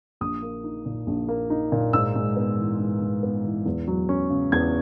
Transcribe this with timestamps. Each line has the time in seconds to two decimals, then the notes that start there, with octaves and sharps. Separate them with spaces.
0.21 A#1 D#6
0.42 A#3
0.64 D#4
0.86 A#2
1.07 A#1
1.28 A#3
1.50 D#4
1.72 A#2
1.93 G#2 E6
2.15 G#3
2.36 B3
2.58 E3
2.80 G#2
3.01 G#3
3.23 B3
3.44 E3
3.66 E2
3.87 F#3
4.09 C#4
4.30 C#3
4.52 E2 G#6